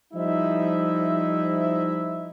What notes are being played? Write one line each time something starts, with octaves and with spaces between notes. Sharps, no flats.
F3 G3 D#4 E4 E5